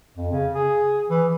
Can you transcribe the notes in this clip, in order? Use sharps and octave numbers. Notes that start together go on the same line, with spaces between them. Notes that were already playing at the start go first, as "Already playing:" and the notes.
F2
C#3
G#4
E3